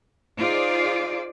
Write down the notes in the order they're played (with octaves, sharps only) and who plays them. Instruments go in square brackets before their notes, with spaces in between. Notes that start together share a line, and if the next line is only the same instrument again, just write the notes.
[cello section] D#4 F4 G#4 C5 D5